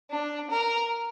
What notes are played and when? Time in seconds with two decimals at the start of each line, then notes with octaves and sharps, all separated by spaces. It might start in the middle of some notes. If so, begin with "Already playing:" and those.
0.11 D4
0.51 A#4